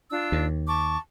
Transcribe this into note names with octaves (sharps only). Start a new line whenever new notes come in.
D4 F4 E6
D#2
A5 C#6 D6